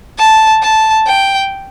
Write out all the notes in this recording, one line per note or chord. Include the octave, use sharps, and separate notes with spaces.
A5
A5
G5